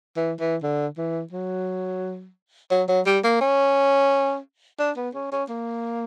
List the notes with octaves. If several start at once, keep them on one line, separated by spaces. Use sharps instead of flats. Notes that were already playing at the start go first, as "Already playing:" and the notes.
E3
E3
D3
E3
F#3
F#3
F#3
G3
A#3
C#4
D4
B3
C#4
C#4
A#3